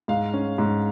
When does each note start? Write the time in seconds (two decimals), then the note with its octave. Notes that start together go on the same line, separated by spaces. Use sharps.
0.08 G#2 F5
0.34 C#4
0.58 G#2